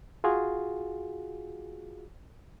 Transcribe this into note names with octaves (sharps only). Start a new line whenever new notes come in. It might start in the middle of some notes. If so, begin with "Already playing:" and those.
F4 F#4 G#4